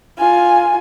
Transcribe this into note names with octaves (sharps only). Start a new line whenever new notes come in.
F4 G#5